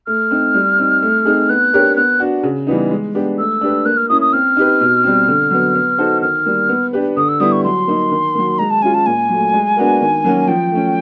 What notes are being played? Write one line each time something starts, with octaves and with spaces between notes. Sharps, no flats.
A3 F6
C4 D#4
G3
C4 D#4
A3
C4 D#4 G#4
B3 F#6
D4 G4 A#4 C#5
B3 F#6
D4 F#4
C#3
E3 G3 B3 D#4
G#3
B3 D4 G4
A3 E6
D4 G4 B4
A#3 F#6
F6
C#4 E4 D#6
D#6
C4 F6
D#4 G4 B4
B2
G3 C4
D3
F#3 B3
B3
D#4 F#4 A4 C5
D#3 F6
G3 A#3
B3
D4 G4 B4
D3 D#6
E6
G3 B3 E4 D#6
C#6
F#3 C6
A#3 D#4
D#3
F#3 A#3
G#3 A#5
A5
C#4 F4 G#5
A5
A#2 G#5
F#3 A3
G#3
B3 D4 F#4 A#4
D#3
F#3 A#3 C#4 F#4
F3 G5
A3 C#4